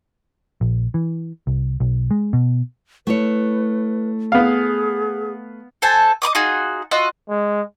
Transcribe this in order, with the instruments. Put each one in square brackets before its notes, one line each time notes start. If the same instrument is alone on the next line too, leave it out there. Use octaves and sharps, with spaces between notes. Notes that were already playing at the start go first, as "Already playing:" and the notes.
[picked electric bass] A#1
E3
C2
B1
G#3
B2
[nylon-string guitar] A3 E4 C#5 [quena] B4
[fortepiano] B3 F5 [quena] G#4
[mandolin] A4 C5 G#5 A5
D#5 B5 D6 D#6
D#4 F4 F#4 G#4
F4 F#4 D#5 E6
[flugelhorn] G#3